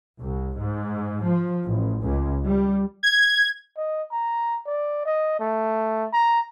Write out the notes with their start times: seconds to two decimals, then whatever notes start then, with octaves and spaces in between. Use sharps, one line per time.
0.19 C2
0.57 G#2
1.24 F3
1.67 A1
2.02 C#2
2.45 G3
3.03 G#6
3.77 D#5
4.12 A#5
4.66 D5
5.06 D#5
5.40 A3
6.13 A#5